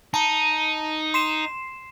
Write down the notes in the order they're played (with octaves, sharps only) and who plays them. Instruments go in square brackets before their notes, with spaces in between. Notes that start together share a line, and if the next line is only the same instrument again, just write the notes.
[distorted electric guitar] D#4 [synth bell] A5 A#5
[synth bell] C6 C7 E7